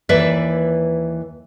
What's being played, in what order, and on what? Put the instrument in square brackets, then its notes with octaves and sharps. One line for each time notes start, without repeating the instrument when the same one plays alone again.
[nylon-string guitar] D#2 E3 B4 D5 E5